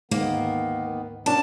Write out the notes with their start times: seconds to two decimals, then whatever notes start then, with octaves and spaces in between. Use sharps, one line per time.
0.11 D2 G#2 D#3 A#3 B3
1.26 F#3 B3 C#4 D4 A#4 A5